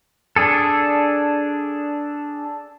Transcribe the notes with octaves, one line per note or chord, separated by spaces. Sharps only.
D4 G#4 A4